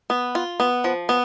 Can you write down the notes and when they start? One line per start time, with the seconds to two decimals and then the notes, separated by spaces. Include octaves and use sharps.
0.10 B3
0.35 F4
0.60 B3
0.84 F3
1.09 B3